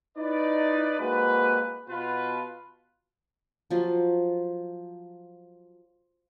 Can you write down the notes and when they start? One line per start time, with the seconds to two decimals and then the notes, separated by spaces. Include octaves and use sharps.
0.18 D#4 E4 B4 D5
0.99 C2 G#3 A#3 F#4 B4
1.89 B2 F4 B4
3.70 F3 F#3 F4